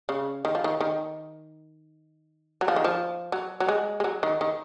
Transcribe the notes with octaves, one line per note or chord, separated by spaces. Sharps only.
C#3
D#3
F3
D#3
D#3
F#3
F3
D#3
F3
F#3
F#3
G#3
G#3
F#3
D#3
D#3